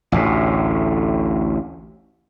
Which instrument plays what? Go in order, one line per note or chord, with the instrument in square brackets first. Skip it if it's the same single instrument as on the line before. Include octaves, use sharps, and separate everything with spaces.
[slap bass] A1 D2 A2